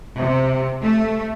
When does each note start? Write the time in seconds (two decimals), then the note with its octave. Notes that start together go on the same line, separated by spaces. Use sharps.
0.19 C3
0.83 A3